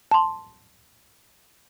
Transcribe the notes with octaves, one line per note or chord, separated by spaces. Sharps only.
A5 C6